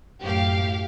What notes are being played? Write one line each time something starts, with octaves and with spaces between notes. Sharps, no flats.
F#2 A2 G4 F5